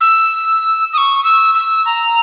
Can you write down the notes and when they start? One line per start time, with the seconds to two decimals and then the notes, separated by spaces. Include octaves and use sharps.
0.01 E6
0.93 D#6
0.98 C#6
1.24 E6
1.55 E6
1.86 A#5